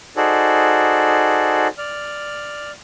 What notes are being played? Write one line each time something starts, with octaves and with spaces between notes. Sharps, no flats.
D#4 F#4 G#4 A4 C5 D5
D5 F6